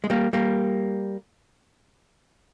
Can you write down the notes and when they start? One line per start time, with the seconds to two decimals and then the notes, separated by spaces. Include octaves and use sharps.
0.04 G#3
0.10 G3 A#3
0.33 G3 A#3